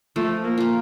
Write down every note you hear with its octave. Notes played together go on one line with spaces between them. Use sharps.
F3 A3
A#3
A#3 F4